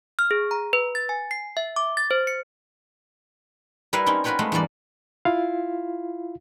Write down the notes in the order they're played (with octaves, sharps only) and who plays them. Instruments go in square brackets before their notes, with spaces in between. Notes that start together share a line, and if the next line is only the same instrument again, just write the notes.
[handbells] F6
G#4
A#5
B4
A6
G#5
C7
E5
D6
A6
C5
C#7
[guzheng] G3 E4 A#4 B4 F5
C4 C#4 D#4 A#4
F4 F#4 A#4 B4 C#5 G5
G#3 A3 B3
E2 G2 G3 A#3 D5
[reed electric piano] E4 F4 F5